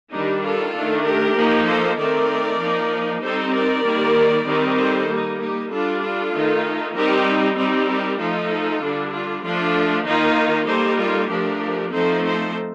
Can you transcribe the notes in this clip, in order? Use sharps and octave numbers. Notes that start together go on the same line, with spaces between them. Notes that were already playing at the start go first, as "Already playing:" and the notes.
D#3 G3 D4 D#4 G4
F4 A4
D#3 A3 D4
G4 A#4
F3 A#3 D#4
A4 C5
D#3 A3 C4 D#4 A#4 D5
F3 A#3 D#4
G3 C4 D#4 A4 C5
A#4 D5
D#3 G3 A#3
D#3 G3 C4 D#4
A4 C5
G3 A#3 D#4
D#4 G4
G3 D4 F4 A4
F4 A4
D#3 A3 D#4
G3 C4 D#4 G4 A#4
G3 C4 D#4
G4 A#4
F3 A3 D#4 F4 A4
D3 G3 D4
F4
F3 A3 D4 F4
D#3 A#3 D#4 F4
G3 A#3 D#4 A4 C5
F4 A4
F3 A3 D4 G4 A#4
F3 A3 C4 D#4 A4 C5
A4 C5